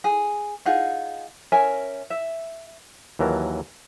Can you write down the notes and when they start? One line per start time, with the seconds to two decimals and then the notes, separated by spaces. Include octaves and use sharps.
0.04 G#4
0.65 D#4 F4 G#4 F#5
1.52 C#4 A#4 E5 G#5
2.10 E5
3.19 D#2 E3 F#3 A#4 A5